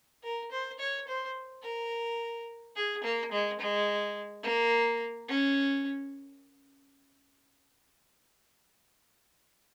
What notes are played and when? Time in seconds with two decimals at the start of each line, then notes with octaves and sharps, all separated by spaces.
0.23 A#4
0.52 C5
0.79 C#5
1.08 C5
1.63 A#4
2.76 G#4
3.04 A#3
3.32 G#3
3.60 G#3
4.44 A#3
5.28 C#4